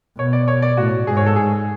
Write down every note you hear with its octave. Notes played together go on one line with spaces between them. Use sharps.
B2 C#5
D5
C#5
D5
A2 F#4
G#2 G#4
C#5
A4
G#4